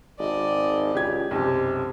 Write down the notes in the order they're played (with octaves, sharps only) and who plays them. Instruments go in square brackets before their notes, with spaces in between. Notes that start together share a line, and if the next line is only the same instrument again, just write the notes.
[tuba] G#1 [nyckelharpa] D5 D#5
[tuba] C#2 [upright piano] G4 G#6
[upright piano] B1 F#2 [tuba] C3 [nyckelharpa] G4